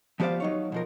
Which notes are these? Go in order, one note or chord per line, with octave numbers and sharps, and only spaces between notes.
F3 B3 G4 C5 D5 F5
F#3 D#4 C#5
B2 F3 A#4